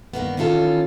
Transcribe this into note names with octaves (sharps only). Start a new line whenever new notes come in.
G2 D#3 A#3 B3
D#3 E3 C#4 F4 A4